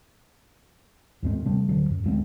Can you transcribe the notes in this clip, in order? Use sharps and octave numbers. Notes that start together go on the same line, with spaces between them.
D#2 G#2 C4
C3 G3 A3 C4
D1 D3 F#3
F#2
D1 G#3 C4